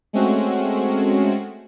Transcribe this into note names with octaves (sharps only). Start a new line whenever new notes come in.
G#3 A3 C4 C#4 F#4